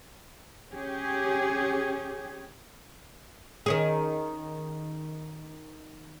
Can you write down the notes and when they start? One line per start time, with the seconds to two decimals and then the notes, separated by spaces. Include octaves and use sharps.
0.73 C#4 G4 G#4
3.66 D#3 C#4 G#4